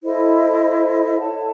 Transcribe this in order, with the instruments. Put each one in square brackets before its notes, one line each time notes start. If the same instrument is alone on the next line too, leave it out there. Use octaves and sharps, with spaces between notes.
[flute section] E4 A4 C5 D#5
A4 C#5 F#5 A5